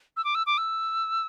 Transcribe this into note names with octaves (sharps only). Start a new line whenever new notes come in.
E6
D6
E6
D6
E6